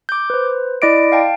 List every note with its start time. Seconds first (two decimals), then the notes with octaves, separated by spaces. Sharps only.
0.09 D6 G6
0.30 B4 C5
0.82 E4 D5 D#5 D6 D7
1.12 F5 G5 A5